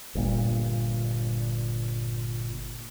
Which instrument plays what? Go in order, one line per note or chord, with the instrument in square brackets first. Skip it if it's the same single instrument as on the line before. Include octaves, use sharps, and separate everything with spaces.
[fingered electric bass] G1 G2 A#2